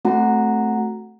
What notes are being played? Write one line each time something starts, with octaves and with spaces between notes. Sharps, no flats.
A3 C4 F#4 F#5 A#5